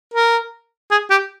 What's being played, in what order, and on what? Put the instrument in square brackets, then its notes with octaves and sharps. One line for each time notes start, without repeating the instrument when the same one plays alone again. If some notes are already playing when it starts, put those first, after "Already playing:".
[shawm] A#4
G#4
G4